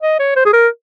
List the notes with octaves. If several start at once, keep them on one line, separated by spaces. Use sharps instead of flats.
D#5
C#5
C5
G#4
A#4